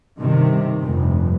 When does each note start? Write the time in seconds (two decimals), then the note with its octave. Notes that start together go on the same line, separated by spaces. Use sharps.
0.18 G2 C3 D#3
0.83 F1 G2